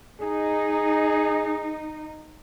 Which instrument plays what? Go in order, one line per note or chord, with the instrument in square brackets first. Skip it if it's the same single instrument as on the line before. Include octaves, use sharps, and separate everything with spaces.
[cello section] D#4 [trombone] G#4